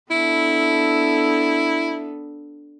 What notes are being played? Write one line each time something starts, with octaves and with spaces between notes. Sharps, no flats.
B3 D4 E4 A4